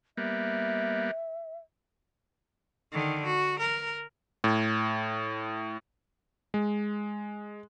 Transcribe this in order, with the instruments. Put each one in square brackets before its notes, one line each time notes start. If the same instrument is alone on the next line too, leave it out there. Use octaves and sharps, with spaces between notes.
[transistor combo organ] G3 A#3 B3 [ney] E5
[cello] D3 D#3
F#4
A#4
[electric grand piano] A2
G#3